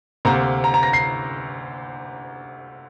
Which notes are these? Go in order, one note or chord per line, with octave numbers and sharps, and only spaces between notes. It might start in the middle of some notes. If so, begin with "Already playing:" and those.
D2 C3 A#3 A#5
A#5
A#5
A#6
C7